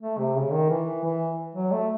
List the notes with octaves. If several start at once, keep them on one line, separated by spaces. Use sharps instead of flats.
A3
C3
C#3
D#3
E3
E3
F#3
A3